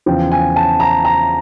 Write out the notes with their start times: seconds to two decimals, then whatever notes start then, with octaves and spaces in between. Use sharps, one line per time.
0.06 E2 C#3 F3 G5
0.32 G#5
0.56 A5
0.80 A#5
1.05 A#5